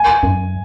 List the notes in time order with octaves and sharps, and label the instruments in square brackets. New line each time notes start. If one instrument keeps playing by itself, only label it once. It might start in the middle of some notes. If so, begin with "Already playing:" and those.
Already playing: [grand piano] G#5
[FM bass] F#2